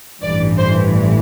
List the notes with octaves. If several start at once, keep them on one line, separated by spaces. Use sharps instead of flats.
A1 G2 E3 D5
C5